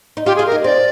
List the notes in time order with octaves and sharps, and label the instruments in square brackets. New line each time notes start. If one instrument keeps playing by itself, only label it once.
[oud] D#4
[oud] F4 [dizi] G4
[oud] F4 [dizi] G#4
[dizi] A#4
[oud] D#4
[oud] C4 [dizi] D5